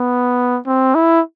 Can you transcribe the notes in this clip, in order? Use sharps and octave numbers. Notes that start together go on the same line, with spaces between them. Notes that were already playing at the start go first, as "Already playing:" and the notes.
Already playing: B3
C4
E4